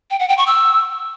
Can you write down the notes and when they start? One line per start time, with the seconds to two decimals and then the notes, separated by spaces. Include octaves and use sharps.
0.11 G5
0.20 F#5
0.29 G5
0.38 C#6
0.47 E6